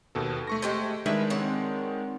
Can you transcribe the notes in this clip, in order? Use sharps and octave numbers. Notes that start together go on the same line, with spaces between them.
D#2 B2 A4
A3 C#6 A#6
G#3 G4 C5
D#3 G3 G#3 D4 E4 B4
C4 C#5 F#5